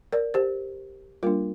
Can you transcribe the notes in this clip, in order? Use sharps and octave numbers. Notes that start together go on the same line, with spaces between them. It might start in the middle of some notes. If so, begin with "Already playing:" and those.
A#4 D5
G4 C5
G3 A#3 D4 F4 A#4